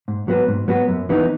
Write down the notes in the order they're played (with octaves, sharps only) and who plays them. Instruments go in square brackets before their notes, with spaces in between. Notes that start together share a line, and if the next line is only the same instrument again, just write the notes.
[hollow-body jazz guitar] G#2
F#3 B3 F#4 B4
G#2
F#3 B3 F#4 B4
F#2
E3 B3 D#4